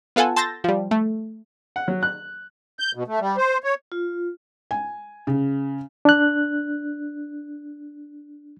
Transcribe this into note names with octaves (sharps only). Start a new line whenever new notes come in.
B3 F4 A4 F#5 G#5
A5 C6 E6 G6 A6 A#6
F3 G3
A3
F#5
F#3
F#6
G6
B2
A3
G3
C5
C#5
F4
G#5
C#3
D4 F#6